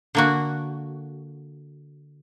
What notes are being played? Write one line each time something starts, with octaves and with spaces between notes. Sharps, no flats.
D3 A#3 F#4